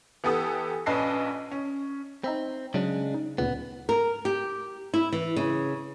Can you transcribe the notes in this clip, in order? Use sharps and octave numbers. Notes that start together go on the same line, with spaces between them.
E3 B3 G4 A4 D#6
A#1 C#4 B4 D#5 A5 C7
C#4
C4 D#4 E5 B5
C#3 F#3 G#3 D4
D#4
D2 A#2 C#3 B3
A#4
G4
E4
E3
C#3